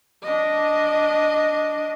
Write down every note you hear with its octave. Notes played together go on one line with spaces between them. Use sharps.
D4 D#5